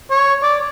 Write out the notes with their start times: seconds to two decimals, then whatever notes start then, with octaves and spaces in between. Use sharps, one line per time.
0.11 C#5
0.43 D5